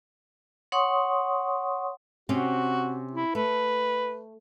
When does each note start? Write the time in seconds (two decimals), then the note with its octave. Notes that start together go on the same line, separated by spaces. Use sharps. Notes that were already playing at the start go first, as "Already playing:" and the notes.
0.72 C#5 F#5 C6 C#6 D#6
2.29 C3 C4 C#4 F#4
3.12 E4
3.35 A3 B4